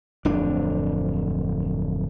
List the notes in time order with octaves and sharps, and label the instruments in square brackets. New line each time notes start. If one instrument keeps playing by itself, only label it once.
[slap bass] D1 F2 D4